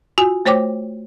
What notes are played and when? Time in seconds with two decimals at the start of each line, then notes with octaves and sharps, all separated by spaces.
0.18 F4 F#4 G#5
0.46 A3 C5 C#5 G5 D6